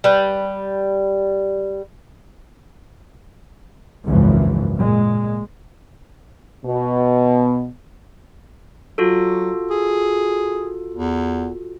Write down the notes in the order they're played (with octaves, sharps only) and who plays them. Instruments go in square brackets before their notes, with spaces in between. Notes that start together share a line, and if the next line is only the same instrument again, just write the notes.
[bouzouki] G3 B4
[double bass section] G#1 C#2 F#2 C#3 E3 F3
A#2 G#3
[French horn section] B2
[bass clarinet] F#3 [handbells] F4 F#4 A4
[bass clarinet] G#4
E2